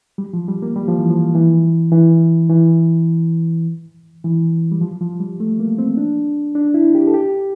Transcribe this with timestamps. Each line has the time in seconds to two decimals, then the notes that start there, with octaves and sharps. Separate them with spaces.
0.18 G3
0.33 F3
0.48 G3
0.62 A#3
0.76 G3
0.88 F3
0.98 E3
1.10 F3
1.35 E3
1.92 E3
2.50 E3
4.24 E3
4.72 G3
4.81 F3
5.01 F3
5.20 G3
5.40 A3
5.60 A#3
5.78 C4
5.97 D4
6.55 D4
6.74 E4
6.95 G4
7.07 A4
7.14 G4